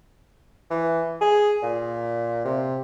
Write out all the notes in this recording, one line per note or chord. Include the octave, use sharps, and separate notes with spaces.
E3
G#4
A#2
C3